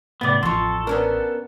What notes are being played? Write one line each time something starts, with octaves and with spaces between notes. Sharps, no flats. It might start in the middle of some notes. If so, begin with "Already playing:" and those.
A2 C#3 B3 D5
A1 F2 F4 A4 C6 C#6
B3 C#4 D4 A#4